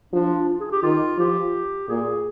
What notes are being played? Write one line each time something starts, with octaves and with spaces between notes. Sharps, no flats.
F3 D4
F4
G#4
G4
D#3 F4
F3 G4
A#2 G#4